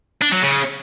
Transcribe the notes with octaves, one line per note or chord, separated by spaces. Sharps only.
D4
F#3
C#3